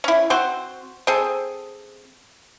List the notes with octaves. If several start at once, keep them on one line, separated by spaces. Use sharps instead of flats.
C#4 E4
C4 F#4 C5
C4 G#4 A4